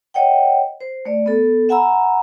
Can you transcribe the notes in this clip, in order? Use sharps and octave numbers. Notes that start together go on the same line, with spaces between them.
C#5 D#5 F#5 G5
C5
A3 D5
B3 A4
E5 F#5 G#5 A#5 B5 E6